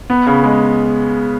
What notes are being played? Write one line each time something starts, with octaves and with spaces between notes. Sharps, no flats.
B3
C#3
G#3